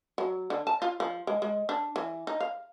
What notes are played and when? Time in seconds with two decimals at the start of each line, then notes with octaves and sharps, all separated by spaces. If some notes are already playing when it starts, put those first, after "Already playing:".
0.18 F#3
0.50 D3
0.67 A5
0.82 F4
1.00 F3
1.27 G#3
1.42 G#3
1.69 D4
1.96 E3
2.27 D#4
2.40 F5